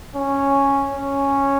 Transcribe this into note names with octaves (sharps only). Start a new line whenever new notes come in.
C#4
C#4